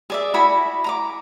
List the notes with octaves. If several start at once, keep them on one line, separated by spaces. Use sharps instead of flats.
G#4 D5 E5
E4 F#4 G#5 B5
A#5 B5 D6